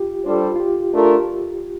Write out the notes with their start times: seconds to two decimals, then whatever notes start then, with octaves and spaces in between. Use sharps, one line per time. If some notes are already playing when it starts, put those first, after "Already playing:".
Already playing: F4 G4
0.26 G3 D4 F4 A4 C5
0.55 F4
0.60 G4
0.93 A3 D4 F4 A#4